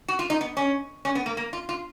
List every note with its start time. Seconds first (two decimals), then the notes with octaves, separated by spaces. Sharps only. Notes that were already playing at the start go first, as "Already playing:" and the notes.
0.08 F#4
0.19 F4
0.30 D#4
0.41 B3
0.57 C#4
1.05 C#4
1.15 B3
1.26 A#3
1.37 A#3
1.53 F4
1.69 F4